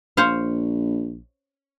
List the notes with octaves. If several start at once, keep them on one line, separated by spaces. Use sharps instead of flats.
A#1 C5 C#5 F5